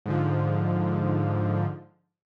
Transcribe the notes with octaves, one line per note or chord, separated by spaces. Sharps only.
G#2 D3 F3